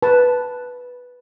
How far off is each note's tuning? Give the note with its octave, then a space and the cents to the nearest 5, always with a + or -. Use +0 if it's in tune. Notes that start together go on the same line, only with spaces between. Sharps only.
B4 +0 A5 +0